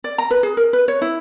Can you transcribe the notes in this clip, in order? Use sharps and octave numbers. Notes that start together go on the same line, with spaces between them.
D5
A#5
B4
G#4
A#4
B4
C#5
E4